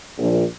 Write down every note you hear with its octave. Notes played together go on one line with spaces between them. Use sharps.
A#1